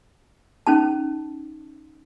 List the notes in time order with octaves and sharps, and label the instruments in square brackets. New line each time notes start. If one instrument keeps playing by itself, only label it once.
[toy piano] C#4 D#4 A5